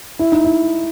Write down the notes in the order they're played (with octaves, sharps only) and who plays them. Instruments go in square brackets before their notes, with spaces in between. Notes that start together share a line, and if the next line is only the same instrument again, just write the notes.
[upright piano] E4
D#4
E4